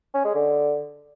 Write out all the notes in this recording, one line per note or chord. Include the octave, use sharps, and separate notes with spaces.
C#4
G#3
D3